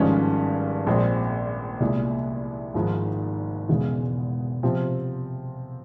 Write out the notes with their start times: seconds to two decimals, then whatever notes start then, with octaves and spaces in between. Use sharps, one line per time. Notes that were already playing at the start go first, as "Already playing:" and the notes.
Already playing: G#1 G2 F3 G#3 C#4
0.86 A#1 A#2 G#3 C4
1.80 C2 A#2 G#3
2.74 G#1 G#2 F3 G#3 E4
3.69 E1 E2 C#3 E3 G#3
4.63 C3 F3 C4